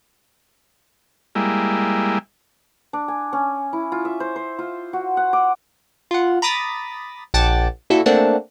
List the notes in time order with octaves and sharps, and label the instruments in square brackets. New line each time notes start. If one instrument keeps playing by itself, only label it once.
[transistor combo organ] G3 G#3 A#3 E4
[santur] D4
G#5
C#4
E4
F4
E5
C5
C5
F4
F#4
F#5
D6
[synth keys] F4 F#5
A#5 B5 D6 D#6 A6 B6
A#1 F#5 G5 A5 D6 A6
A#2 E4 F#4 A4
A3 A#3 C4 D4 F#5 A5